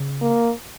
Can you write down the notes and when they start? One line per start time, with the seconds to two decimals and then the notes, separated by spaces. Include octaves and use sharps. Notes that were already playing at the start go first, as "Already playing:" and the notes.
Already playing: C#3
0.22 A#3